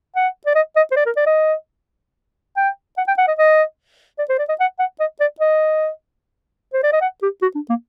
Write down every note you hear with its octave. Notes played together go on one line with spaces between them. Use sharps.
F#5
D5
D#5
D#5
C5
D5
A#4
D5
D#5
G5
F#5
G5
F#5
D#5
D#5
D5
C5
D5
D#5
F#5
F#5
D#5
D5
D#5
C5
D5
D#5
F#5
G4
F#4
D4
A#3